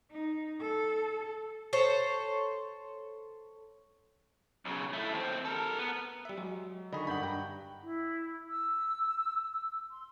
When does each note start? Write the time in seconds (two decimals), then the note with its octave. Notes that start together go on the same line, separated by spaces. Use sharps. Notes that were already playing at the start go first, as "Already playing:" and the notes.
0.11 D#4
0.60 A4
1.73 A4 C5 C#5
4.65 B1 C#3
4.93 A3 E4
5.12 D#2 C4
5.45 A4 A#4
5.78 B3
6.25 G3 E5
6.37 F#3 G#3
6.93 D3 D#3 G#4 D#5 B5 C#6
7.07 G2 F#5 B5 G6 F#7
7.23 G5 A#5
7.83 E4
8.49 E6
9.91 C6